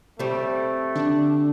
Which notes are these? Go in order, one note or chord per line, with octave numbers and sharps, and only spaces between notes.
G3 A3 C4
D3 D4